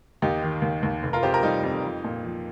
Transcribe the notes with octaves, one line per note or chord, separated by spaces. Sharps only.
D#2 D#4 G4
D#3
D#2
D#2
F1
F4 A#4
F2 G4 C5
F4 A#4
G3 D#4 G4
F2
F3
A#2
F3